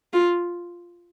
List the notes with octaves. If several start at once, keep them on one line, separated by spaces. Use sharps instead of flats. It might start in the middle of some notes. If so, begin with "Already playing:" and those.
F4